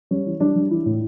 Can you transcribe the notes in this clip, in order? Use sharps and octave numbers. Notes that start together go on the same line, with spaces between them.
G3 C#4
E3
G3 D4
G3
E3 E4
A2